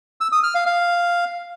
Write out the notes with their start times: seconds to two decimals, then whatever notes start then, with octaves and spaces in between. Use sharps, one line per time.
0.21 E6
0.32 D#6
0.44 F6
0.55 F5
0.66 F5